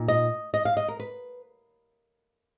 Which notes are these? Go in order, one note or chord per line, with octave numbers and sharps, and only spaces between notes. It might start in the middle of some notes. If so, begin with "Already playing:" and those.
Already playing: A#2 D#4
D#5
D#5
F5
D#5
A#4
B4